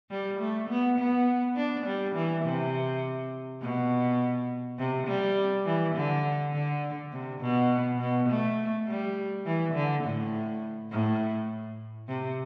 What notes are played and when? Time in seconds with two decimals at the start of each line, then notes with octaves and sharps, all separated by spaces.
0.10 G3
0.40 A3
0.69 B3
0.98 B3
1.56 D4
1.86 G3
2.15 E3
2.44 C3
3.61 B2
4.79 C3
5.07 G3
5.65 E3
5.95 D3
6.53 D3
7.12 C3
7.41 B2
7.99 B2
8.29 A3
8.87 G3
9.46 E3
9.74 D3
10.04 A2
10.91 A2
12.08 C3